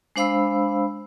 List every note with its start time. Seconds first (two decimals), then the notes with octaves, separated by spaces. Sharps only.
0.16 G#3 D4 C5 F5 B5 E6